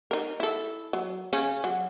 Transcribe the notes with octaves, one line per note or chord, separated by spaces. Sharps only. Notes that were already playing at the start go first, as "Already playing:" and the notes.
D#4 A#4
E4 A4
F#3
C#3 C#4 G#5
F#3